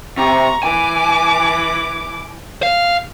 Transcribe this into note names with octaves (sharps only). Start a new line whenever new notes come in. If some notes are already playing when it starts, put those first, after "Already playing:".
C3 A#5 C#6
E3 G#5 D6
F5